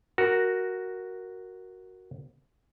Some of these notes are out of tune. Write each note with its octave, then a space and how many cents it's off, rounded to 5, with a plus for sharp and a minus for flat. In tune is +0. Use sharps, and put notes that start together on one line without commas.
F#4 +0 A#4 +0